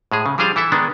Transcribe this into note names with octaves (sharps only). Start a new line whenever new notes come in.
A2 G#3 G#4
C#3
F3 G3 D4 G#4 C5 F5
E3 E4 A4 E5
D#3 G#3 B3 D4